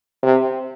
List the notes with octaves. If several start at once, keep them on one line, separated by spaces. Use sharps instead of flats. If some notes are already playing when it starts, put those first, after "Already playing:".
C3